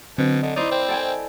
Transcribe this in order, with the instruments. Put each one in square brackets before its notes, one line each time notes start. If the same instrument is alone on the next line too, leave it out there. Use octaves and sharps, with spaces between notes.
[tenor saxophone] B2 [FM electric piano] D3 F#3 C4
[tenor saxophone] D3 [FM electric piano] D#5
[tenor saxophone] D#4 [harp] E4 C5 D5
[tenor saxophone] C4
[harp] A4 G5 G#5